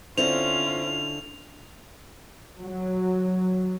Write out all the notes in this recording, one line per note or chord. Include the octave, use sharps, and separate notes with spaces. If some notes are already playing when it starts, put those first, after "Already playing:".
D3 C4 C#4 E4 F4 C5 F7
F#3